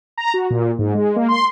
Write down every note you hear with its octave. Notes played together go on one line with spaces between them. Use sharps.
A#5
F#4
A#2
G#2
G#3
A#3
C6